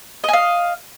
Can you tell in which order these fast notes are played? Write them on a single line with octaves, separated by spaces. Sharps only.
D#5 G#5 F5